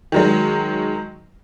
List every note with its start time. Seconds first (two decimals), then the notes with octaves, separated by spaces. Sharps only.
0.12 D#3 F#3 G#3